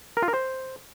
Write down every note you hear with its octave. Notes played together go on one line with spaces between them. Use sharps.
A#4
F4
A#4
C5